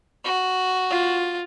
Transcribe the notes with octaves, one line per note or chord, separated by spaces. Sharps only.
F#4
F4